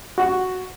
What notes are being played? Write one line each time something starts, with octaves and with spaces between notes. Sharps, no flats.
F#4